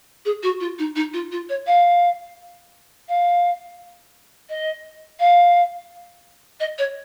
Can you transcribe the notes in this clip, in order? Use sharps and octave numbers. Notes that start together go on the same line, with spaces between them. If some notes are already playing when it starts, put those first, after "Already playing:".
G#4
F#4
F4
D#4
D#4
F4
F4
C#5
F5
F5
D#5
F5
D#5
C#5